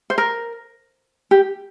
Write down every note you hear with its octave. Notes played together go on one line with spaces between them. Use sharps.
C5
A#4
G4